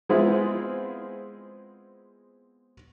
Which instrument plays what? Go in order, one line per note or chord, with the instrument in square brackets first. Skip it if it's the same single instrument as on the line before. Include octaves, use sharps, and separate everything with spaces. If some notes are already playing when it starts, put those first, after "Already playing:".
[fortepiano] G#3 B3 C4 E4 F4 G#4